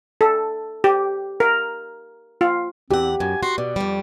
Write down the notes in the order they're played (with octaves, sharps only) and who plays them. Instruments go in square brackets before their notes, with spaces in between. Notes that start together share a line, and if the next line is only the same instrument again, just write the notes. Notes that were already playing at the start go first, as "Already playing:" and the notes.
[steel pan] A4
G4
A#4
F4
[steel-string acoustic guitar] E2 F#5 [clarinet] C4 [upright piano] G4
[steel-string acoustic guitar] F#2 [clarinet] G#5
[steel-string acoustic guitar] F#4 [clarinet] C6
[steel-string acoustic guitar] B2 [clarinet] D5
[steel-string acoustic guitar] F2 G3